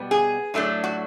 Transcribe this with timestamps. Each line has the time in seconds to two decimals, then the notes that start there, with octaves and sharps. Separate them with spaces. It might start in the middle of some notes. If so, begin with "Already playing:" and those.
Already playing: B2 G3 B3
0.11 G#4
0.54 A2 F#3 A3 D4
0.84 F#4